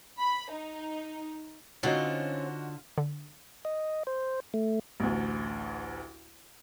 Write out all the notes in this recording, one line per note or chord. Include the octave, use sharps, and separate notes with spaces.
B5
D#4
D3 C4 C#4 D#4 F4 F#4 C5 C#5
D3
D#5
C5
A3
A1 D2